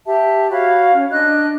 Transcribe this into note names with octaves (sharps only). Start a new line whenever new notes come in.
G4 E5 A5
F#4 C#5 F5 B5
C#4
D4 D#5 F#6